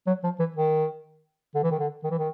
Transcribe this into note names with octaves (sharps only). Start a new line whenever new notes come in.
F#3
F3
E3
D#3
D3
E3
D#3
D3
D#3
E3
D#3